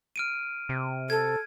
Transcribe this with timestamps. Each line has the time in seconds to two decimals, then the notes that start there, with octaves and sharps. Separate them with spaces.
0.16 F6 D7 D#7
0.69 C3
1.10 A4 G#6